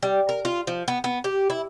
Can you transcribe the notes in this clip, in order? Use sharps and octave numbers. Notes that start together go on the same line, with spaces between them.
G3
A#4
F4
F3
B3
B3
G4
E4